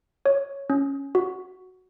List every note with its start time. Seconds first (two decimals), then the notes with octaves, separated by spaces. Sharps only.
0.26 C#5
0.70 C#4
1.15 F#4